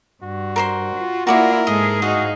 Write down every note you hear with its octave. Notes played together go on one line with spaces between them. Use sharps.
G2 F#4
A#4 C5 C6
F4
A#3 E4 F#4 A#4 D5 C#6
G#2 G#3 G#4 A4 D#5
D#4 F#4 D#5 F5